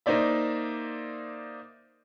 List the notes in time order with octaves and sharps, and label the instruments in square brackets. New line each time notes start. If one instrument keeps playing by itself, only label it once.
[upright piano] A#3 D#4 C5 D5 E5